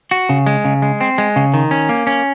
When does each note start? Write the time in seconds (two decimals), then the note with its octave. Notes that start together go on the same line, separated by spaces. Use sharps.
0.11 F#4
0.29 C#3
0.46 G#3
0.65 C#3
0.82 G#3
1.01 C4
1.18 G#3
1.36 C#3
1.54 D#3
1.71 C#4
1.89 A#3
2.07 C#4